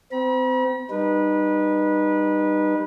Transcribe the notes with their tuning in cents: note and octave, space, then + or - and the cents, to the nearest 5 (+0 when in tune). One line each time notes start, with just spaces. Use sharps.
C4 -30 B5 -45
G3 +0 D#4 -25 B4 -25